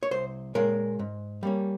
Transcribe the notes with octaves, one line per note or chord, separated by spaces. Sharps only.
C#5
C2 C5
A#2 G#3 C#4 A#4
G#2
G3 A#3 C#4